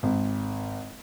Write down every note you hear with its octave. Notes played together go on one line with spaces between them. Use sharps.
G#1